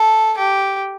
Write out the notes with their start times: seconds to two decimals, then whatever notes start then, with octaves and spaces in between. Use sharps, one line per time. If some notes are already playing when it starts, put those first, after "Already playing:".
Already playing: A4
0.38 G4